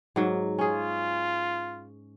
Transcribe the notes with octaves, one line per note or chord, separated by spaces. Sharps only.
G#2 F#3
C#4 F4 G#4